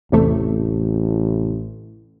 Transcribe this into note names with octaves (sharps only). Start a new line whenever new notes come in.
A1 E2 C3 A3